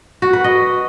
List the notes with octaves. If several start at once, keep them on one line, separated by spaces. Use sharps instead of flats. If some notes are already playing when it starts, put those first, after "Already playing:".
F#4
B4
D#5